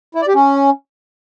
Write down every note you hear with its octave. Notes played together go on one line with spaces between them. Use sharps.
E4
D5
G4
C#4